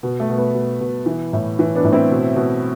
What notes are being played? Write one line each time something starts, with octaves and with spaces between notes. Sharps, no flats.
B2
A3
B2
B3
B2
B2
E3
A2
E3
B3 D4
A2
C4 E4
B2
B2